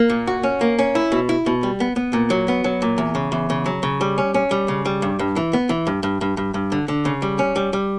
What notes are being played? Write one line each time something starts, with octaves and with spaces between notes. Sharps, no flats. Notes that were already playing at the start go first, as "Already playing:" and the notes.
Already playing: A#3
A#2
F#4
C#4
A#3
C#4
E4
B2
E4
B2
G3
B3
B3
A#2
F#3
B3
F#3
A#2
E2
C#3
E2
C#3
F#3
C#3
G3
C#4
C#4
G3
C#3
G3
G2
G2
E3
B3
E3
G2
G2
G2
G2
G2
D3
D3
C#3
G3
C#4
G3
G3